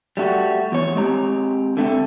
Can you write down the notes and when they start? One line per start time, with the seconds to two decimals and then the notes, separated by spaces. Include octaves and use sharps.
0.17 G3 A3 E4 F#4
0.72 E2 C#5
0.95 G#3 C4 G4 A#5
1.77 D3 A3 C4